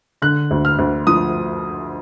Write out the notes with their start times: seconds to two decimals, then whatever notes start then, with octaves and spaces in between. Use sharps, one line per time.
0.22 D3 F#6
0.51 D2
0.65 F6
0.79 D2
1.07 F3 D#6